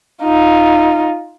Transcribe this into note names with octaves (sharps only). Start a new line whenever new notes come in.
D#4 F4